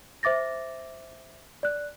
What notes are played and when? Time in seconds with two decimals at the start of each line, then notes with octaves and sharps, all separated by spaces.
0.23 C5 E5 D6 A6 A#6
1.63 D5 F#6